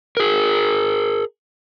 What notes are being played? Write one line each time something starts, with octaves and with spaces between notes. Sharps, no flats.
G#4 A#4